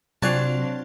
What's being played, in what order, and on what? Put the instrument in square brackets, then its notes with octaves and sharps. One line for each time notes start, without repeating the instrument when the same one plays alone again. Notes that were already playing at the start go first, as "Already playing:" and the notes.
[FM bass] C3 [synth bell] F#3 F4 [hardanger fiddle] C4 D4 [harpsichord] D5 G#5 A5